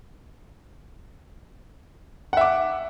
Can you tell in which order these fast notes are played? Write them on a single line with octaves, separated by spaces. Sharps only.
F#5 E5 D6